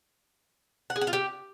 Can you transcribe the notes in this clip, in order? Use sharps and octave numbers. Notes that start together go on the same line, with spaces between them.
F#5
G#4
F#5
F4
G4